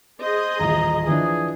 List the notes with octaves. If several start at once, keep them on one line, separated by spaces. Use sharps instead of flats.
G#4 C5 D#5
D#1 A1 A#5
E3 F3 D4 G#4